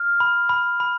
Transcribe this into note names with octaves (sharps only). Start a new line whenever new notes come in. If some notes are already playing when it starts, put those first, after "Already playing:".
Already playing: F6
B5
B5
B5